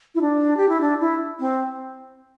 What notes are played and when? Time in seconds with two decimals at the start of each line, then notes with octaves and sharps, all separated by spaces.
0.15 E4
0.21 D4
0.57 G4
0.69 E4
0.81 D4
1.01 E4
1.40 C4